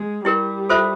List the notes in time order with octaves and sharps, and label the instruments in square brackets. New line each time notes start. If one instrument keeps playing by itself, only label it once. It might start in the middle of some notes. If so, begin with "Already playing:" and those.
Already playing: [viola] G#3
[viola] G3 [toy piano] E4 G4 A#4
[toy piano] F4 A4 C5 E5